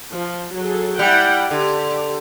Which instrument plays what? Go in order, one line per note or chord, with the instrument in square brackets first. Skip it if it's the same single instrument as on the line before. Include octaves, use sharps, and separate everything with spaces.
[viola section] F3
F#3 G#4 A4
[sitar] G3 [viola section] E4 F#5 G5
[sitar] D3 [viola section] G4